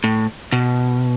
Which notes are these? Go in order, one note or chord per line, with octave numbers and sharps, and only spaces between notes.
A2
B2